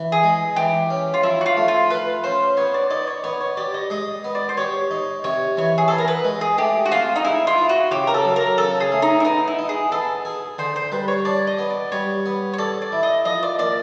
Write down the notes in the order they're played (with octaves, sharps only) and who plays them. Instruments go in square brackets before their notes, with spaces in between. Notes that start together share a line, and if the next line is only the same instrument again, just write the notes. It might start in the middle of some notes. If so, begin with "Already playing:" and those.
Already playing: [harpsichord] E3
[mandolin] G#4
[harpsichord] G#3
[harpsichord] E3 [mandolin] G4
[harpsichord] C#4
[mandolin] F4
[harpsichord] F3 [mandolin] E4
[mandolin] F#4
F4
[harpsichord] A3
[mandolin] F4
[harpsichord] F4 [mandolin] B4
[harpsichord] C#4 [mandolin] C5
[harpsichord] B3 [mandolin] C#5
[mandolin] D5
[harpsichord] D#4 [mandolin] D5
[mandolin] C#5
[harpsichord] B3 [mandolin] C#5
[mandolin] C#5
[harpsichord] G4 [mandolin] D5
[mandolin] D#5
[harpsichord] G#3 [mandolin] D#5
[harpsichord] B3
[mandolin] D5
C5
[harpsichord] G4 [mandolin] C#5
[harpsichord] D#4
[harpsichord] C3 [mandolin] C#5
[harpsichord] E3 [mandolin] C#5
[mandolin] G#4
[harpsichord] B3 [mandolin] A4
[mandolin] A#4
B4
[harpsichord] G#3
[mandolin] G#4
[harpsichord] A3 [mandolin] G4
[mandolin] F#4
[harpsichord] C4 [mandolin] F4
[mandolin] D#4
[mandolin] E4 [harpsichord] G#4
[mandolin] F4
[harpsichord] E4
[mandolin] F#4
[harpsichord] C#3 [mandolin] G4
[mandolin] A#4
A4
[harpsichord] F#3
[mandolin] A#4
[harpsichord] C#3 [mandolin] A4
[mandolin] G#4
[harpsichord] A3
[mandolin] D#4
E4
[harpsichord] B3 [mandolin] D#4
[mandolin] E4
[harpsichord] D#4
[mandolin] G#4
[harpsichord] B3 [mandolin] A4
[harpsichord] G#4
[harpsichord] D3 [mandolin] C5
[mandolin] C5
[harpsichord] G3 [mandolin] B4
[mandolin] C#5
[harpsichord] D4 [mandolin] D5
[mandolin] D#5
[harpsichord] B3
[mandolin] D5
[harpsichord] G3 [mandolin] C#5
[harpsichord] B3
[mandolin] C#5
[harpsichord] A4 [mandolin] D5
[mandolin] D5
[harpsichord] E4
[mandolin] D#5
[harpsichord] F3 [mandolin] D#5
[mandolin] D5
[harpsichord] A#3 [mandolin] D5